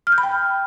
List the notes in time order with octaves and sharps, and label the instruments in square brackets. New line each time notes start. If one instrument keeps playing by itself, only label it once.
[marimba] F6
G6
B5
G5